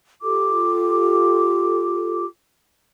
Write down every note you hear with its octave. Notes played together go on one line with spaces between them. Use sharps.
F4 G4 A4 D6